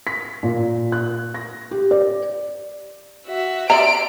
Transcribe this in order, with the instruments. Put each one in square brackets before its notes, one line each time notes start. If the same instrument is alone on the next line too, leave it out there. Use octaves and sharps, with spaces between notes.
[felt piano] B6
A#2
F#6
A#6
G4
D5
[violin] F#4 E5
[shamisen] D5 E5 A#5 [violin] C6 D7